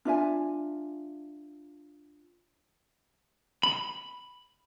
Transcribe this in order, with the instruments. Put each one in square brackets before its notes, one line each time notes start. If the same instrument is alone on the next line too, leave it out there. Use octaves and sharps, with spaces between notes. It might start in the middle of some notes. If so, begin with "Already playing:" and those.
[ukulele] D4 F4 E5 G#5
[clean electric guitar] B5